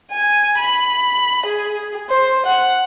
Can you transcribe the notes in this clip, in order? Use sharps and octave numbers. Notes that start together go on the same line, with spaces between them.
G#5
B5
G#4
C5
F#5